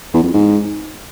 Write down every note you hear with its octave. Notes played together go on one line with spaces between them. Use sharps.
E2
F2
G#2